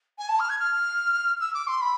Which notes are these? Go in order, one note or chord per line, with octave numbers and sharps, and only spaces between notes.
G#5
A5
F6
G#6
F6
E6
D6
C6
B5